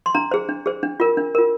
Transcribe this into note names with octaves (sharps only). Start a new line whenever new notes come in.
C6
D4 A#5
G#4 C5
D4
G#4 C5
D4
F4 A#4
D4
F4 A#4